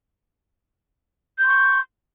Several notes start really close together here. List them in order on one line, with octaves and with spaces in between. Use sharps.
G6 C6 C#6